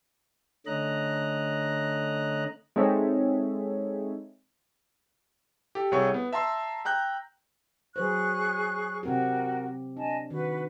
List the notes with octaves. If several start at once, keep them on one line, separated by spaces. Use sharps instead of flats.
D3 A3 C#4 D#5 A#5 F#6
G#3 C4 D#4 A4 C#5 E5
G4 A4
C2 G3 G#4 A4 C#5 C#6
B3
E5 A5 A#5 C6 E6
G5 A#5 F#6 G6
F#3 G#4 B4 C5 C#6 F#6
C3 C4 F#4 G4 A#4
D4 D#5 G#5 A5
D#3 F#4 B4